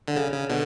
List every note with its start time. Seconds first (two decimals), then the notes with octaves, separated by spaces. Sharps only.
0.08 D3
0.16 C#3
0.33 C#3
0.49 B2 D3